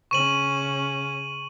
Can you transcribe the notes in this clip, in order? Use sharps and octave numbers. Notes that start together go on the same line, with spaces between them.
C#3 C#4 C#6 D#7 F#7